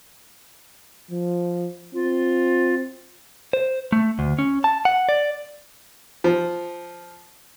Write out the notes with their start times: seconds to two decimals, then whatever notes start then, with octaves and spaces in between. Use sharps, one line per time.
1.11 F3
1.94 C4 F4
3.53 C5
3.92 A3
4.19 D2
4.39 C#4
4.64 A5
4.85 F#5
5.09 D5
6.24 F3